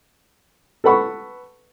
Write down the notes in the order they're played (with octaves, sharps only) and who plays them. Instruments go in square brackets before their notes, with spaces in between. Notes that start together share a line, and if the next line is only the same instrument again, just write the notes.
[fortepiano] A4 B4 F#5 B5 C#6